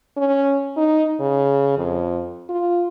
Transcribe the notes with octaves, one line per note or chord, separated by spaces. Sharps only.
C#4
D#4
C#3
F2
F4